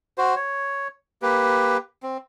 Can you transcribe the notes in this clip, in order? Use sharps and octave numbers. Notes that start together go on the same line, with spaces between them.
F#4 C5
C#5
A#3 G4 B4
C4